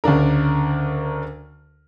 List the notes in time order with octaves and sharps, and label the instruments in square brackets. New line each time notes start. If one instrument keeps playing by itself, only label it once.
[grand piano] D2 C#3 D4 A#4